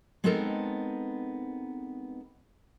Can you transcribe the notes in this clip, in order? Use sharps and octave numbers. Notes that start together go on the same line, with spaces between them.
G#3 B3 C4 D#4 A4 A#4